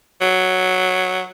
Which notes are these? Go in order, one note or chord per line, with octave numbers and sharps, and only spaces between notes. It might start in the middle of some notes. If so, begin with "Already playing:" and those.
F#3